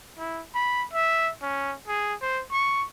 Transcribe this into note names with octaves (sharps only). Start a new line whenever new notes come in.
E4
B5
E5
C#4
G#4
C5
C#6